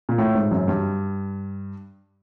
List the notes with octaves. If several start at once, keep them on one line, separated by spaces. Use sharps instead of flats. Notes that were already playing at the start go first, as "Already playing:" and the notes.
A#2
A2
G#2
F#2
G2